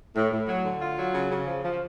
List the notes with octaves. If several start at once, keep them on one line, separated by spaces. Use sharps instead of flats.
A2
A2
F#3
D3
F4
F#3
C#3
C#3
F3
F3